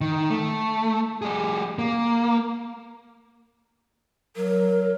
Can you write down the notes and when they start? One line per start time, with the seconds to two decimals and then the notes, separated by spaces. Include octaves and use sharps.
0.01 D#3
0.30 A3
1.22 G3 G#4
1.79 A#3
4.36 F#3 A#4